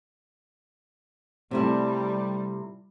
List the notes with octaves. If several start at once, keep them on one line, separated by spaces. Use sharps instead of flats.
C3 G3 A3 E4